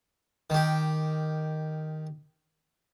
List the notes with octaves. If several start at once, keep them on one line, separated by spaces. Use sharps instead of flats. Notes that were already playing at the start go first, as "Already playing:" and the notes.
D#3 G4